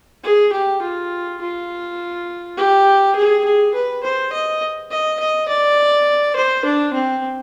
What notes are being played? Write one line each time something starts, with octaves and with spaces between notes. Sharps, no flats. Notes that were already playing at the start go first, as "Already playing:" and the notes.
G#4
G4
F4
F4
G4
G#4
G#4
B4
C5
D#5
D#5
D#5
D5
C5
D4
C4